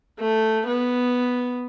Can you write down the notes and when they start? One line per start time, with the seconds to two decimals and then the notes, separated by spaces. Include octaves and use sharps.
0.20 A3
0.67 B3